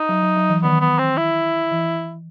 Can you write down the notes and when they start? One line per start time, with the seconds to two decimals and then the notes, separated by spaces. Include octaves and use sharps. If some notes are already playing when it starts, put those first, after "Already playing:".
Already playing: D#4
0.09 F#3
0.23 F#3
0.37 F#3
0.49 E3
0.63 D#3 B3
0.81 B3
0.99 C4
1.17 E4
1.71 E3